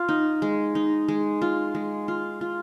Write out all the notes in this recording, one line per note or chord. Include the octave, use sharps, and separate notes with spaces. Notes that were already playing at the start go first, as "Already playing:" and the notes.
Already playing: F4
D#4
G#3
D#4
G#3
F4
G#3
F4
F4